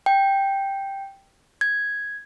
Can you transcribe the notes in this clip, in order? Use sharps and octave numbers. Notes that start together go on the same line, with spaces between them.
G5
G#6